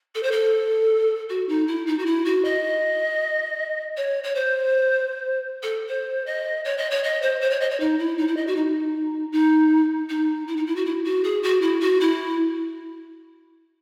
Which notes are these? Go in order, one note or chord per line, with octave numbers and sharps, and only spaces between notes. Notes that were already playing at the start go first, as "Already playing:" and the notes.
A4
C5
A4
F#4
D#4
E4
D#4
F#4
E4
F#4
D#5
C#5
C#5
C5
A4
C5
D#5
C#5
D#5
C#5
D#5
C5
C5
C#5
D#5
C#5
D#4
E4
D#4
E4
D#5
F#4
D#4
D#4
D#4
E4
D#4
E4
F#4
E4
F#4
G#4
F#4
E4
F#4
E4